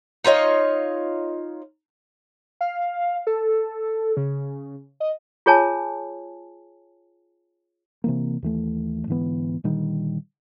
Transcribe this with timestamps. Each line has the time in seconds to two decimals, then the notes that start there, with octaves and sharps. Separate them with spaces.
0.24 D#4 F4 C#5 D#5
2.61 F5
3.27 A4
4.17 C#3
5.00 D#5
5.46 F4 G#4 C#5 G#5 A5
8.04 C3 E3 A#3
8.42 D#2 E3 A3
9.07 G#2 D3 E3 B3
9.64 A#2 D3 D#3 G3